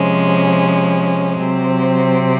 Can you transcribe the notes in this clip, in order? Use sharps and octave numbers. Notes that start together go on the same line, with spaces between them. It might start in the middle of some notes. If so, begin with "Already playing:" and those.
Already playing: C3 F3 G#3 C#4
C3 F#3 C4